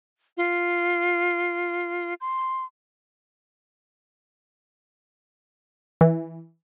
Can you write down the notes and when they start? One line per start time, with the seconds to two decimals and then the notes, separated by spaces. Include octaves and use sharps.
0.37 F4
2.21 C6
6.01 E3